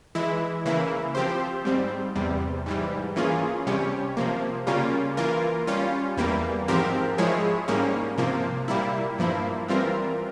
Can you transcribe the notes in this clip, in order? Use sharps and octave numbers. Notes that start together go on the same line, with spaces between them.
E3 G#3 E4
C#3 E3 A#3 E4
F3 C4 G4 C5
G#2 G3 C4
E2 C3 G3
G#2 E3 G3
E3 A#3 C#4 F4 G#4
C3 G3 C#4 G4 C#5
C3 F3 A#3
C#3 G3 A#3 C#4 F4
E3 A#3 F4 A#4
G3 C#4 F4
E2 E3 G3 A#3
G#2 F3 C4 G4 A#4
F3 G#3 E4 G#4 C#5
G#2 G3 A#3 C#4
C3 F3 A#3
A#2 G3 A#3 E4
G2 F3 A#3 E4
E3 G3 C4 F4 A#4